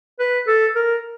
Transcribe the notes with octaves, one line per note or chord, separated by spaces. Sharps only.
B4
A4
A#4